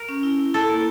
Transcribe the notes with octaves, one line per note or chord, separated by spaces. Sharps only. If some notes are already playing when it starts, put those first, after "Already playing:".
Already playing: A#4
C#4
E4
E4
E4 A4
A#3